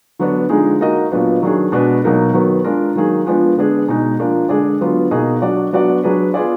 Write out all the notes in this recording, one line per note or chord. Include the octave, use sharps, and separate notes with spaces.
D3 F#3 B3 D4 F#4
D3 F3 G#3 D#4 G#4
A#3 D#4 F#4 A#4 D#5
A#2 F#3 B3 D4
D#3 F#3 D4 G#4
B2 G#3 D4 F#4 B4
B2 F#3 A#3 D#4 A#4
D#3 F#3 B3
G#3 D4 F4 A#4
D#3 F#3 A#3 D#4 G#4
F3 G#3 B3 D4
D3 G#3 B3 D4 G#4
B2 G#3 D#4
F3 A#3 D4
D3 G#3 D4 G#4 D5
D3 F#3 B3 F4
B2 A#3 D#4 G#4 D#5
F#3 D4 F#4 D5
F#3 B3 D4 F#4 D5
F#3 D4 G#4 B4
B3 F4 G#4 D5